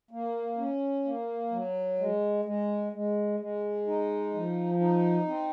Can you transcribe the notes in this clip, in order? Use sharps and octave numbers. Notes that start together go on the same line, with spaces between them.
A#3
C#4
A#3
F#3
G#3
G#3
G#3
G#3
D#4
F3
D#4
C4